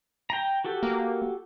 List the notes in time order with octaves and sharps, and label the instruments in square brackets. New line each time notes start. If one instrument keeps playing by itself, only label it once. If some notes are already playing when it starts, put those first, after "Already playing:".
[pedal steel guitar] G5 A#5
F#4 G4 A4
[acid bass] A#3